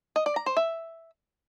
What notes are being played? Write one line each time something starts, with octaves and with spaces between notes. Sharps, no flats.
D#5
D5
A#5
C5
E5